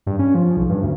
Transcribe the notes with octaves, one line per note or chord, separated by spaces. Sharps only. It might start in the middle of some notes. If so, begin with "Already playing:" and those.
G2
C#4
F3
B1
G2
D2